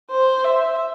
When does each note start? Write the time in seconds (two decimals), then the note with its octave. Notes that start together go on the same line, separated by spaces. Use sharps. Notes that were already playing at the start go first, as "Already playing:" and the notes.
0.11 C5
0.45 E5